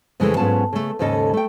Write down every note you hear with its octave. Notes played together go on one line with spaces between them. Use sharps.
F2 C#3 E3 G#3 A3
G#2 F#3 B3 C#4 F4 A5
C#3 A3
D#2 G#2 C#3 C#4 A4 D#5
A3 G5